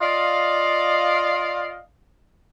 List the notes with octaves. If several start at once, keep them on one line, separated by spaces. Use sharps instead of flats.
F4 D5 D#5 F5